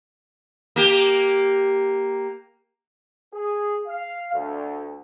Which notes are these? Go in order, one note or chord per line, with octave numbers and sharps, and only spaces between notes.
A#3 G4
G#4
F5
D2